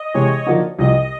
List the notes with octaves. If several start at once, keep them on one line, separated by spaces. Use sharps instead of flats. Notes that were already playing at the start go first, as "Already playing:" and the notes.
Already playing: D#5
C3 E3 G#3 C#5
D3 F3 A#3 D#4 F#4
C2 C3 F3 D#5